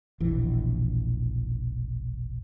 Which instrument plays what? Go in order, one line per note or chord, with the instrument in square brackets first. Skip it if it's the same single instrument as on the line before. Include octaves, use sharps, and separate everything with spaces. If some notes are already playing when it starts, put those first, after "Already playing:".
[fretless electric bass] E1 A#1 E3